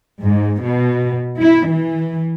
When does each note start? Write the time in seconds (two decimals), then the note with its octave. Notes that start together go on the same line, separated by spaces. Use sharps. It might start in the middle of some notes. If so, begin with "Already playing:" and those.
0.23 G#2
0.61 B2
1.39 E4
1.68 E3